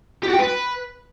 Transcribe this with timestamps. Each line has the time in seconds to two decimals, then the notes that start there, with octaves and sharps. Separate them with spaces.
0.23 G4
0.28 F#4
0.34 G5
0.39 B4